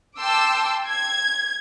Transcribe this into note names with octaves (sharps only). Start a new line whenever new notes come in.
G5 A5 C6 D6 E6
G#6